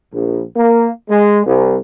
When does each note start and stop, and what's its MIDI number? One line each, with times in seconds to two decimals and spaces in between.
0.12 0.40 34
0.56 0.88 58
1.09 1.41 56
1.46 1.76 36